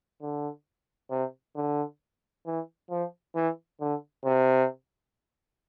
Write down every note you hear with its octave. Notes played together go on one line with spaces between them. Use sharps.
D3
C3
D3
E3
F3
E3
D3
C3